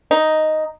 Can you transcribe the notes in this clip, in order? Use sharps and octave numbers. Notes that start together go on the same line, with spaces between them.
D#4